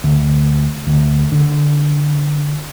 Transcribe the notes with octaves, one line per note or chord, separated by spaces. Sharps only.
D2
D2
D3